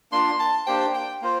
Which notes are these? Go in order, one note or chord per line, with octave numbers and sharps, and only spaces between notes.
A#3 D4 F4 C6
A5
A#3 D4 G4 C5 G5
G5
A#3 F4 C5